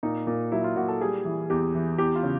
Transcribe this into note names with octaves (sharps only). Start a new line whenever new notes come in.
A#2 D#4
A#2
F#3 E4
F4
A#2 F#4
A4
G3 G#4
E3
E2 G4
E3
E2 G4
F4
C#3